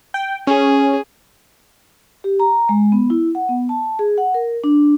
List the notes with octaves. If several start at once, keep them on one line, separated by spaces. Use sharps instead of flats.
G5
C#4 G#4
G4
A#5
G#3
B3
E4
F#5
B3
A5
G#4
F#5
A#4
D4